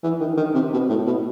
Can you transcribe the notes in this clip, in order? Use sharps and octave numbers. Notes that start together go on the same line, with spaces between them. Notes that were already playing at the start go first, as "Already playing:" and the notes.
E3
D#3
D#3
C3
B2
A2
B2